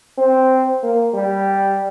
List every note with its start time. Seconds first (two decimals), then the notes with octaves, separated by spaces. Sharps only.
0.18 C4
0.83 A#3
1.14 G3